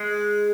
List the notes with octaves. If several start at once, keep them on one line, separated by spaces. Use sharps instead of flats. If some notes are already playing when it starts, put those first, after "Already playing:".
Already playing: G#3